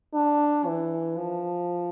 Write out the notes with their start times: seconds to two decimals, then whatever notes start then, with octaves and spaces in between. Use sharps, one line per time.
0.14 D4
0.66 E3
1.18 F3